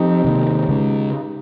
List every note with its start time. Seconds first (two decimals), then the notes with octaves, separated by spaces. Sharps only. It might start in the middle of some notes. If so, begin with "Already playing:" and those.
Already playing: F3 C4 D#4 G4
0.24 C3 D#3 A#3
0.69 C#3 G#3 C#4